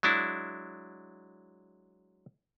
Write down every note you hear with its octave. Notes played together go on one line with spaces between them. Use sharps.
F#3 G#3 D4 E4